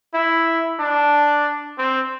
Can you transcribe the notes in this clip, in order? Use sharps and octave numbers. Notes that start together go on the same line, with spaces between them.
E4
D4
C4